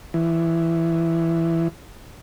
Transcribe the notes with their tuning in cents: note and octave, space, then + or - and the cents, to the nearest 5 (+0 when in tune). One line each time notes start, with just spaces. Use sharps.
E3 +10